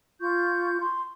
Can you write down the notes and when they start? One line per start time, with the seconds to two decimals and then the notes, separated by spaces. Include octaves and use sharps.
0.21 F4 C#6 G6
0.81 C6